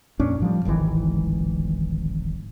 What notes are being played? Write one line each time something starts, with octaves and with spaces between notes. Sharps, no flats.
F2 A#2 C#4 D4
A2 F3 G3
D1 G#1 D#3 E3